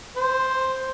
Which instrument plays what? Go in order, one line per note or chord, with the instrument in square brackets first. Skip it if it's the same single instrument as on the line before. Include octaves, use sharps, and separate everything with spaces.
[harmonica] C5